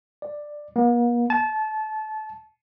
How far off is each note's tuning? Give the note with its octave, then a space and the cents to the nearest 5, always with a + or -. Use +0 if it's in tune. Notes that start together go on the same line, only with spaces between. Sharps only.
D5 +10
A#3 +45
A5 -25